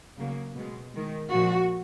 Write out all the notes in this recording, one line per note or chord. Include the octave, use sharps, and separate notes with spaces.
C#3 F#3 A#3
B2 G#3
D#3 G#3
A#2 F3 G#3 F#4